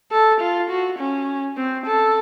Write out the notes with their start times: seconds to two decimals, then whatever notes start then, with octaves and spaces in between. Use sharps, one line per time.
0.12 A4
0.40 F4
0.70 F#4
0.99 C#4
1.57 C4
1.86 A4